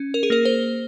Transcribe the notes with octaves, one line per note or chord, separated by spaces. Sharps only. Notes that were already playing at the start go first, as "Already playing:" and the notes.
Already playing: C#4
A#4
G#4
A#3 A#4
C5